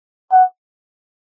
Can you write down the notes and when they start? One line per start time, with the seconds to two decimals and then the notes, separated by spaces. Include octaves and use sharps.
0.32 F#5